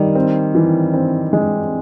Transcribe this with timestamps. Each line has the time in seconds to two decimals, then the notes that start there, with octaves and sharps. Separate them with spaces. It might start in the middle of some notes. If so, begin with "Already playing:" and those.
Already playing: D#3 G3
0.15 C4
0.55 E3
0.94 C4
1.33 G#3